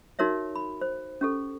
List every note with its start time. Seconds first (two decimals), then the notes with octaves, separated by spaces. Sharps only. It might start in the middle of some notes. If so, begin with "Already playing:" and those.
0.19 D#4 F#4 A#4 C#5 E5
0.56 B5
0.81 C5
1.21 C#4 G4 A4